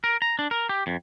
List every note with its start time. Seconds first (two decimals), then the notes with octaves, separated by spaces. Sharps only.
0.04 A#4
0.22 A#5
0.39 D4
0.51 A#4
0.69 G4
0.87 F2